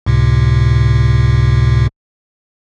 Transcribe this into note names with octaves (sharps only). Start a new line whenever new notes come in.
C#2 A2 C3